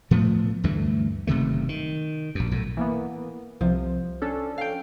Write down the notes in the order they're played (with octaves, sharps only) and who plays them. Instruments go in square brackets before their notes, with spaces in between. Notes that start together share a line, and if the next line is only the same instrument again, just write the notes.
[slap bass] A2 F3 A3 B3
D2 G2 E3 A3
F#1 C3 D#3 A3
D#3
A#1 F#2
B1 A2
[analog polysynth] E3 A#3 B3
[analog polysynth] C2 C3 [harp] F3
[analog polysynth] C#4 D4 A4
[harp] F5 G5